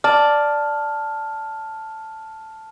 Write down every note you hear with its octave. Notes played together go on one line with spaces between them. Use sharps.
D5 A5 F6